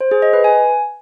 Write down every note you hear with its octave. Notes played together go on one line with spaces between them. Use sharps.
C5
G#4
D#5
B4
G#5